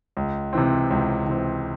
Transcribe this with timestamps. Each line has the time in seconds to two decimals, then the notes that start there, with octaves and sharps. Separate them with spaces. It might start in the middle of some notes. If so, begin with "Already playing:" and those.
0.17 C#2
0.53 C3 E3 C4
0.90 C#2
1.26 C3 E3 C4